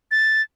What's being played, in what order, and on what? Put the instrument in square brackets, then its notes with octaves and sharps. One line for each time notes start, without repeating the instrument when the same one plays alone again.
[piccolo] A6